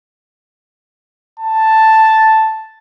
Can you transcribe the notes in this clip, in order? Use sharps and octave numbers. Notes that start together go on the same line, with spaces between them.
A5